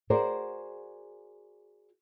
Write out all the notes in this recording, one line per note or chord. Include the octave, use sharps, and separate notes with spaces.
F#4 G#4 A#4 C5 D5